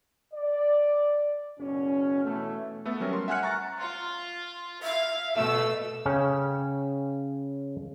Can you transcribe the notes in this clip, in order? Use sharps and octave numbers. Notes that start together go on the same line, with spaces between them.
D5
F#1 B2 C#4
B2 E3 A3
A3 B3 A4 E5
F#3 G3 C#4 F#4 A#4
C6
E5 F#5 G#5 F6 F#6 C#7
A#5 C#6 A6
F4
E5 F5
B2 A3 E6
C#3 C#4 C#5 G5